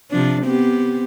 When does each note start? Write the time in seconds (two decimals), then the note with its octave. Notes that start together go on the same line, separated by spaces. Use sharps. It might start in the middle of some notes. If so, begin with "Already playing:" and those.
0.11 C3 F3 D4
0.45 B3 C4 G4